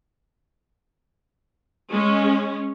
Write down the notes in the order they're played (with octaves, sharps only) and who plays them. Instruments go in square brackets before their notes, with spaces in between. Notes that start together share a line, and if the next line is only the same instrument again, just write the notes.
[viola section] G#3 C#4